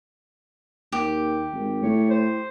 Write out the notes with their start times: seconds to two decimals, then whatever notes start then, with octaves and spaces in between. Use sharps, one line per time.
0.92 D#2 G4
1.53 G#1
1.83 A2 C#5
2.10 C5